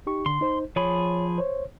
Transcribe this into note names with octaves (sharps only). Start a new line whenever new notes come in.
D#4 G4 C#6
D3 C6
D#4 C5
F3 G#4 C#5 B5
C5 C#5